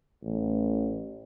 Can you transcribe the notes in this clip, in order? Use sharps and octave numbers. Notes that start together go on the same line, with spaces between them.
A1